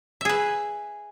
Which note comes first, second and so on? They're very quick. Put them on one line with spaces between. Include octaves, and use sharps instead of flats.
E5 G#4 B4